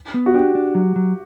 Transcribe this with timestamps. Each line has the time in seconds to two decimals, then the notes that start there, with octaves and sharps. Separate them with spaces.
0.14 B3
0.26 F#4
0.34 D4 G4
0.55 D4
0.75 F#3
0.96 F#3